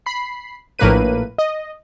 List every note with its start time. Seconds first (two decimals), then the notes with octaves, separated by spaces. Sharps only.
0.06 B5 C7
0.79 A#1 A2 A#3 A#4 B4 D#7
1.38 D#5